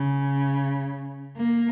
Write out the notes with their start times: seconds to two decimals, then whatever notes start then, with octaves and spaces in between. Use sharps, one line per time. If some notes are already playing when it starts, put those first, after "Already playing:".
Already playing: C#3
1.37 A#3